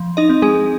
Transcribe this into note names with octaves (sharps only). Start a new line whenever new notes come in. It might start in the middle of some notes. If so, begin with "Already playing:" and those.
Already playing: F3
D#4 D#5
C4
G#3 G#4